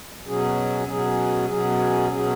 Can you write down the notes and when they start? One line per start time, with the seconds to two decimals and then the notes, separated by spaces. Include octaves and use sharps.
0.24 B2 F#3 C#4 G#4
0.87 B2 F#3 C#4 G#4
1.49 B2 F#3 C#4 G#4
2.10 B2 F#3 C#4 G#4